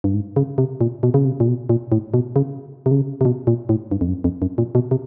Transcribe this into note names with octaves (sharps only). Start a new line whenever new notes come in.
G2
G#2
C#3
C3
A#2
B2
C#3
C3
A#2
B2
A#2
A2
B2
C#3
C3
C#3
C3
B2
A#2
A2
G2
F2
F#2
F2
F#2
A#2
B2
C3